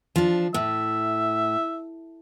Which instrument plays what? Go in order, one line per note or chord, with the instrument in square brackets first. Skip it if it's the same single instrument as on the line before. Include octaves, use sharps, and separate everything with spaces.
[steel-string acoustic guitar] F3 D4
[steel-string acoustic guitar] A2 [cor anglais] E5